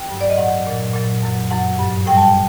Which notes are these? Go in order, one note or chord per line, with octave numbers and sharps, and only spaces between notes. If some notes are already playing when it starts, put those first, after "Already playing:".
Already playing: G5
G2 F#3
D5
D#5
A2 F#3 F#5
A#2 F#3
A#2 F#3
F#2 F#3
F#2 F#3 F#5
G2 F#3
A2 G3 G5
A5
G5